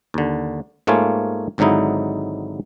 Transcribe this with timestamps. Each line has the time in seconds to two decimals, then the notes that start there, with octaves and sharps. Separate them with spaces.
0.14 D#2 D3
0.87 G#2 A3 A#3 F4 C#5 G#5
1.58 G#1 G#2 D3 F#3 D#4 E4